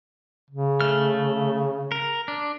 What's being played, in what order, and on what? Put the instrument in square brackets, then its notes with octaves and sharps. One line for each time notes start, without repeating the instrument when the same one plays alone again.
[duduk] C#3
[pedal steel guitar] A3 F6
A#4
D4